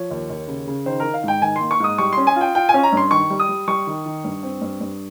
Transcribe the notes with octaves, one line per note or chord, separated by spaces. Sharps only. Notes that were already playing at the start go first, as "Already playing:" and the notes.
Already playing: F3 C#5
D#2
D#2
C#3
C#3
D#3 C5
D#3 A#4
F5
G#2 G5
D#3 G#5
C6
A#3
C#6
G#2 D#6
G3 C#6
C#4 C6
G#5
F4
G5
F4 G5
G#5
C#4
A#5
G2 C6
D#3 C#6
G3
D#6
G3
G3 C#6
D#3
D#3
G2
C4
G2
G2